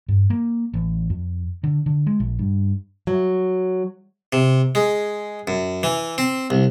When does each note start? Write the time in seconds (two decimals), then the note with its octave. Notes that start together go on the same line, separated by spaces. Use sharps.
0.08 G2
0.30 A#3
0.74 A1
1.10 F2
1.64 D3
1.86 D3
2.06 G#3
2.20 A#1
2.39 G2
3.07 F#3
4.33 C3
4.75 G#3
5.47 F#2
5.83 E3
6.18 C4
6.50 C2